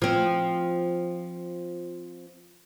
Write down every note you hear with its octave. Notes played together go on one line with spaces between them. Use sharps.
F3 C4